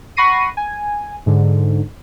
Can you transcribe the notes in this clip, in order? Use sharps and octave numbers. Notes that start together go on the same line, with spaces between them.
F#5 B5 C#6 A#6 C7 D#7
G#5
G#2 D3